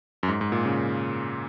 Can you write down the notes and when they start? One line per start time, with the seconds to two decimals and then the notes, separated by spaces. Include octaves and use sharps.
0.23 F#2
0.28 G#2
0.41 G#2
0.52 A#2
0.65 C#3